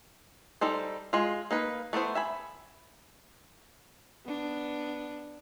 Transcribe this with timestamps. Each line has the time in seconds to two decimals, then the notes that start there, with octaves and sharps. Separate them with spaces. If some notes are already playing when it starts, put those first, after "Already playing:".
0.61 G3 D#4 A4 C5
1.13 G#3 F4
1.51 A#3 D#4 B4
1.93 A3 B3 E4 C5
2.15 E5 G#5 B5
4.25 B3 D4